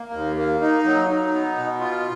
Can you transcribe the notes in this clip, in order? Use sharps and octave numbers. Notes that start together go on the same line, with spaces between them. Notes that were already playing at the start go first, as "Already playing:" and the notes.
Already playing: A#3
D#2
A#3
D#4
F#3
D#4
B3
B2
F4